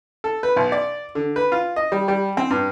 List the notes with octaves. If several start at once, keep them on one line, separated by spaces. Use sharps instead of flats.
A4
B4
B1
D5
D3
B4
F4
D#5
G3
G3
C4
G2